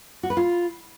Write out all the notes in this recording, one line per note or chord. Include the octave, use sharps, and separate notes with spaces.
F#4
B4
F4